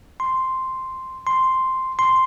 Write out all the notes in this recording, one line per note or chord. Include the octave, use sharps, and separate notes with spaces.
C6
C6
C6